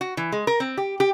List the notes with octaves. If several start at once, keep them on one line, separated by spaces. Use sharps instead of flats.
F#4
E3
G#3
A#4
C4
G4
G4